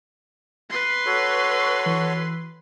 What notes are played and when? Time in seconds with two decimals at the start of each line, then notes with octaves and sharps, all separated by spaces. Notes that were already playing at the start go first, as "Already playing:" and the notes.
0.70 B4 C6
1.06 F#4 A4 C#5
1.86 E3